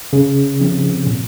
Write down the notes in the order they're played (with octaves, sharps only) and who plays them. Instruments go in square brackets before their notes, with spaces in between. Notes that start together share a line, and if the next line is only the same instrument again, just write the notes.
[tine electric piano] C#3
F3 C4
A#2